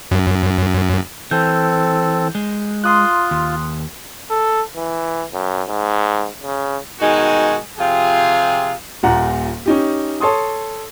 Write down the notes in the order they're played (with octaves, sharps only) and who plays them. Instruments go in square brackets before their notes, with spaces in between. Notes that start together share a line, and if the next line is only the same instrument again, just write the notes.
[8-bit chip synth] F#2
[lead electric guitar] E3 [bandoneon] C4 A4 [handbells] G6
[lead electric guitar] G#3
[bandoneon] F4 [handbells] C6 D#6 F#6
[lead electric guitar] D#2
[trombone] A4
E3
F#2
G#2
C#3
[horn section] B2 D#3 G#3 D#4 F#4 G#5
C3 F3 F4 G4 G#4
[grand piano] D#1 A#2 F#5 A#5
C#4 D#4 G4
A4 C#5 C6 D#6